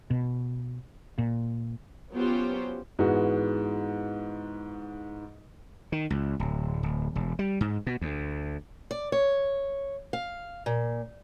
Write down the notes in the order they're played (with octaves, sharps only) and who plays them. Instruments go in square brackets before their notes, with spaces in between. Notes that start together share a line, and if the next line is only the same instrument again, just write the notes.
[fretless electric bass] B2
A#2
[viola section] F#3 B3 C#4 F4 G4 C5
[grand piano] G#2 E3 G#3 B3 F#4
[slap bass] D#3
C#2
D1
D1
E1
G3
G#2
B2
D2
[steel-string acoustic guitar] D5
C#5
F5
A#2